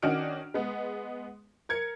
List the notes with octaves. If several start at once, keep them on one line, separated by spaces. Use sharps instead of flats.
D#3 C#4 D4 F#4 F6 D7
G#3 B3
A#4 G#6 C#7